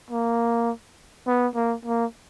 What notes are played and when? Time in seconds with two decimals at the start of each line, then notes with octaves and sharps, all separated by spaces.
0.10 A#3
1.27 B3
1.55 A#3
1.85 A#3